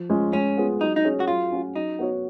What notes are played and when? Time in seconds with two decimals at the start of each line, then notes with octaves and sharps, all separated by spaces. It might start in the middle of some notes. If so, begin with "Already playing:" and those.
Already playing: F3
0.09 G#3 C#4 F4
0.33 G#3 C#4
0.58 B3 F4 G#4
0.81 F#3 D#4
0.96 D#4
1.05 C#4 G#4 C#5
1.20 F#4
1.28 F#3 F4
1.52 C#4 F#4
1.75 F#3 D#4
1.99 B3 F#4 C#5